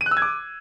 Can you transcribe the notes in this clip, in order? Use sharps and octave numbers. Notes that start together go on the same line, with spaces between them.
D#7
F#6
E6
G#6
D6